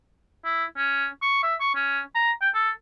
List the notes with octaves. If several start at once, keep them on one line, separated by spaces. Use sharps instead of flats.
E4
C#4
C#6
E5
C#6
C#4
A#5
G5
A4